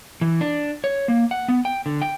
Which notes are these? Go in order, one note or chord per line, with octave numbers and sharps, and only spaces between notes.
E3
D4
C#5
A#3
F#5
B3
G5
D3
G5